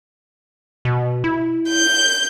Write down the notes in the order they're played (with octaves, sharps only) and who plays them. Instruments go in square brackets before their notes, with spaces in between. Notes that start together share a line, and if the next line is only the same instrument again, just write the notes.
[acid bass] B2
E4
[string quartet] G6